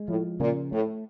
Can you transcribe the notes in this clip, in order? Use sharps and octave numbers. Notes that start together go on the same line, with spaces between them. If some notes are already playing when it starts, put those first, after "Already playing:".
Already playing: G#3
A2 F3
A#2 C#3
A2 A3